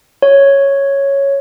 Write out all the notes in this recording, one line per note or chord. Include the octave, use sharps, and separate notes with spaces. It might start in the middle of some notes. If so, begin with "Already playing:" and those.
C#5